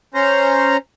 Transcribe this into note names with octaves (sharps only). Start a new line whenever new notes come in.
C#4 C5 A#5